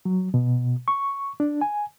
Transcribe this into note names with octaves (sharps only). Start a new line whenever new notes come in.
F#3
B2
C#6
D4
G#5